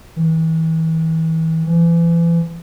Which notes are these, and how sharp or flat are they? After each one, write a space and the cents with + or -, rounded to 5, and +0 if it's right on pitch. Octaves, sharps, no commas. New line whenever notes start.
E3 -35
E3 +35